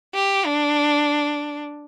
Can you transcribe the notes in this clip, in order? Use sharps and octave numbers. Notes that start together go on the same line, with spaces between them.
G4
D4